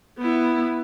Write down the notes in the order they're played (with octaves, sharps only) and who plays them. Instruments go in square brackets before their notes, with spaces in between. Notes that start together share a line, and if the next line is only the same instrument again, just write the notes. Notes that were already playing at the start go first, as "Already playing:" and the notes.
[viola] B3 E4